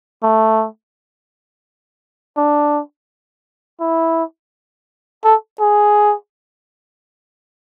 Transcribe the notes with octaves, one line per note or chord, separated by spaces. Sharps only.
A3
D4
E4
A4
G#4